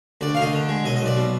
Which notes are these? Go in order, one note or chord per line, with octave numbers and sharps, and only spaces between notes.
D2 D5
F5
D2 D#5
D3
G#3
B1 D#5
B1 D#5
D5
B2